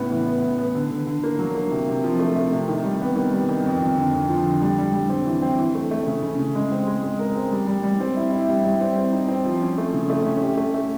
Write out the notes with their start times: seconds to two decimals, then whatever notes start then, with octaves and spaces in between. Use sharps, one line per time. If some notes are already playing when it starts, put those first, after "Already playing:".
Already playing: A2 C#3 B3
0.10 E3
0.26 B3
0.42 A2
0.58 B3
0.75 D3
0.91 D3
1.07 D3
1.24 A#3
1.39 F#3
1.55 A#3
1.71 C3
1.88 C3
2.04 F3
2.19 A3
2.36 A3
2.52 C3
2.68 D#3
2.84 G3
3.01 B3
3.16 D#3
3.33 G3
3.49 D#3
3.65 F2
3.82 F2
3.97 D3
4.13 F2
4.29 F3
4.45 D3
4.62 G3
4.78 G3
4.94 G3
5.09 C4
5.25 E3
5.42 C4
5.58 E3
5.75 A3
5.91 A3
6.06 C#3
6.22 C#3
6.39 C#3
6.55 G#3
6.72 C4
6.87 G#3
7.03 G#3
7.19 A#4
7.36 C4
7.51 G3
7.67 G3
7.83 G3
8.00 C4
8.17 E4
8.32 E4
8.48 G3
8.64 G3
8.81 C4
8.96 C4
9.13 D#4
9.28 C4
9.45 F3
9.62 C#4
9.78 A3
9.94 C#3
10.10 A3
10.26 C#4
10.42 G4
10.57 A3
10.74 A3